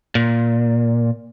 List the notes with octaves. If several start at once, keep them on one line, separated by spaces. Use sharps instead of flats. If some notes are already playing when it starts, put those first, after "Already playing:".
A#2